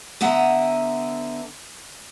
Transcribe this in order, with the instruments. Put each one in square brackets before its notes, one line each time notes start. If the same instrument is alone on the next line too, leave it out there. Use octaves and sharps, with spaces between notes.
[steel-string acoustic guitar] D3 B3 E5 F#5 A#5